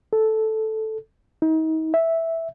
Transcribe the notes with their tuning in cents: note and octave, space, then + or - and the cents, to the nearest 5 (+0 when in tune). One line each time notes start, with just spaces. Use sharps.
A4 -5
D#4 +35
E5 -5